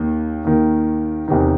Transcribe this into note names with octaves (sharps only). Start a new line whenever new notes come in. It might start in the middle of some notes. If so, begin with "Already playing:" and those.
Already playing: D#2 D#3
D#2 D#3
E2 C3 D#3